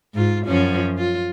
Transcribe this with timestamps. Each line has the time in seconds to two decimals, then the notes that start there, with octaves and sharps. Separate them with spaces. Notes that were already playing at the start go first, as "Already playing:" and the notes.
0.14 G#2 F4
0.46 F#2 F3 C#4
0.98 F4